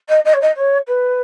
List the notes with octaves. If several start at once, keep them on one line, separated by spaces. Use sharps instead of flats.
D#5
D#5
C#5
D#5
C#5
B4